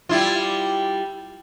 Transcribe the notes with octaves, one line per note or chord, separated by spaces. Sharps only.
G3 E4 F4